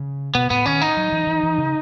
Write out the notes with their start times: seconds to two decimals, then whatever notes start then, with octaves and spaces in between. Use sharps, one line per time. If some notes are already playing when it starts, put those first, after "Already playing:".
Already playing: C#3
0.35 B2 B3
0.50 A2 B3
0.66 D#3 C#4
0.81 D#4
0.97 F#3
1.12 E3
1.27 E3
1.43 E3
1.58 C#3